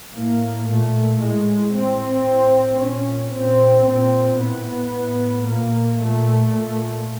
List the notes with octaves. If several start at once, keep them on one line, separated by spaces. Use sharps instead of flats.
A2 A#3
A#2 A3
A2 G#3
A2 C4
A2
A#2 C#4
A#2 C4
A#2 C4
A2 B3
A2
A#2 A#3
A#2 A3
A#2